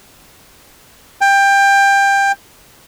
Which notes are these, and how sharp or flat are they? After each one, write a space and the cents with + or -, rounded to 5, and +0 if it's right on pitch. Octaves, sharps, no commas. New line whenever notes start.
G5 +20